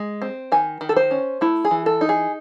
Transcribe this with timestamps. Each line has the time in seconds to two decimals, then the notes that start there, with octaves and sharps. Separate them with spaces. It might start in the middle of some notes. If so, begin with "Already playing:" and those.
Already playing: G#3
0.22 C4
0.52 D#3 G#5
0.81 D#3
0.89 A4
0.96 C5
1.11 C#4
1.41 A3 E4
1.65 G#4
1.71 E3
1.86 A4
2.01 D#4
2.09 G#4